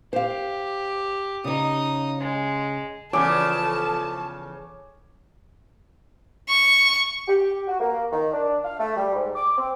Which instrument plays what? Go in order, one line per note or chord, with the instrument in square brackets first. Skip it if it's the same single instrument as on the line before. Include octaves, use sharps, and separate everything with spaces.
[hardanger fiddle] G4 [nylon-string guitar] C5 F5
[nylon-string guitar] C#3 C#5 [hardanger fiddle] D#4 D#6
[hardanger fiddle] G#3
[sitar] E2 C#3 [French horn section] F3 A4 [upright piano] C#5 G#5 D6 [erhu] A5
[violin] C#6
[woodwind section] G4
F#4
A#3
D#3
D4
F5
A3
G3
G#2
D6
C4